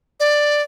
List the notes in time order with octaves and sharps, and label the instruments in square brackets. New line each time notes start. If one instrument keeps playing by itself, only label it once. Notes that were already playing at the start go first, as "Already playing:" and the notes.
[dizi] D5